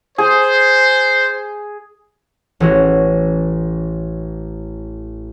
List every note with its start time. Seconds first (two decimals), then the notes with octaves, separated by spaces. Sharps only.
0.18 G#4 C5
2.60 A1 E3 F#4